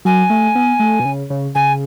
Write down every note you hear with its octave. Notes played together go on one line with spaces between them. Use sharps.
F#3 G#5
A3
B3
A3
B2
C#3
C#3
C#3 G#5